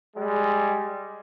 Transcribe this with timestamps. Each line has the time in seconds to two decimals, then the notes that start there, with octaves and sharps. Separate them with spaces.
0.16 G3 G#3